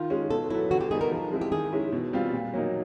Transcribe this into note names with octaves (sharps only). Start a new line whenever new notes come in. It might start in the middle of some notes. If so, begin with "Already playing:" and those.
Already playing: D#3 F4
G#3 C#4
B2 A4
F#3 B3 E4
D3 F#4
G4
G3 B3 D#4 G#4
A#4
F3
G#3 C4 E4
G4
D#3 G#4
G#3 C#4 E4
B2
G3 C4 F4
A#2
F#3 A#3 D#4